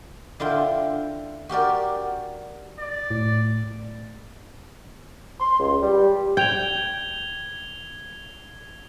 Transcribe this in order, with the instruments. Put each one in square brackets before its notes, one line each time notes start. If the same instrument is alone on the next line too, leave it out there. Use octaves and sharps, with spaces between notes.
[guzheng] D3 E4 F4 G5
F#4 G4 A#4 D5
[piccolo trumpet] D5
[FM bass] A2
[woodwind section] C6
C#2
G3
[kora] G5 [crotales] G#6 F7 G7